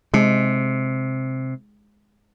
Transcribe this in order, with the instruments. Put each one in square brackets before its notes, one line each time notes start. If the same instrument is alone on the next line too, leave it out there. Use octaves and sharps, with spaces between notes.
[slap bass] C3 [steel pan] G#3